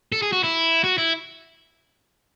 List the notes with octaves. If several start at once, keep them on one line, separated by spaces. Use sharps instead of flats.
A4
G#4
F#4
E4
F#4
E4